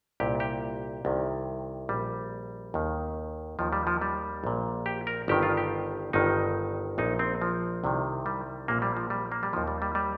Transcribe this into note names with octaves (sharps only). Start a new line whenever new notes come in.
C2 A#2 G4
G4
C2 C3 D#3
A#1 A#2 G3
D#2 D#3
D#2 D#3 F3
G3
F3
G3
A#1 A#2
G4
A#4
G1 G2 D#3 G4
F4
G4
G1 G2 D#3 D#4
A#1 A#2 D#4
C4
F3
C2 C3 D#3
G3
A#1 A#2 A#3
G3
F3
G3
A#3
G3
D#2 D#3 F3
G3
G3
G3